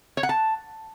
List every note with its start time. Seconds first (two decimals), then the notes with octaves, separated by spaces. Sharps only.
0.17 C#5
0.23 F#5
0.29 A5